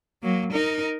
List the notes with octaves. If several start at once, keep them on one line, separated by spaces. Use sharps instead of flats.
F#3 A#3
D#4 A#4